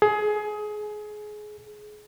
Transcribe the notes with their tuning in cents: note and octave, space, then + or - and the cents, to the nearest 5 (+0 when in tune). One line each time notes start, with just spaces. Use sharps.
G#4 +25